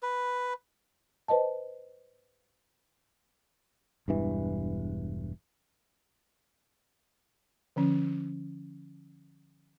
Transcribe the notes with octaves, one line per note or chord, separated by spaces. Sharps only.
B4
B4 C5 D#5 A5
E1 G2 E3
D3 F3 C#4